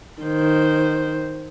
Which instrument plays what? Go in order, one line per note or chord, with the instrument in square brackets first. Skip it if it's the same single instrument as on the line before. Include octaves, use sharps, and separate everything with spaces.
[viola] D#3 C5